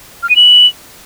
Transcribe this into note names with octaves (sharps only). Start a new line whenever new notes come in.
F6
D#7
F#7